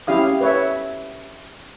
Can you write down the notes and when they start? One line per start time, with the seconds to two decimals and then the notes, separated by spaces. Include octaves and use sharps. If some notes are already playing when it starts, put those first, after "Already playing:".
0.07 C#4 E4 G4 F5 D#6
0.41 B4 C#5 E5